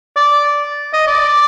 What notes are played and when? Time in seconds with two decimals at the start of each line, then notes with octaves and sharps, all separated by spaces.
0.16 D5
0.94 D#5
1.07 D5